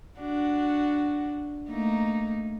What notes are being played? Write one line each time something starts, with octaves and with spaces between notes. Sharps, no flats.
D4 F#4
A3 A#3 D#4